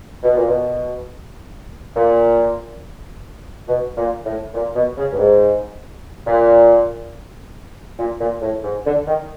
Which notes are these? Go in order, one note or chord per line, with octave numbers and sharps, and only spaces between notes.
B2
A#2
B2
A#2
B2
A#2
A2
A#2
B2
C#3
G2
G#2
A#2
A#2
A#2
A2
G#2
D3
D#3